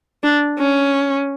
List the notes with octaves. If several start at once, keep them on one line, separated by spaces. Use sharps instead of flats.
D4
C#4